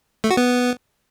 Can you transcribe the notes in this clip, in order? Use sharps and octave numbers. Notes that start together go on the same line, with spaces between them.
A3
F#4
B3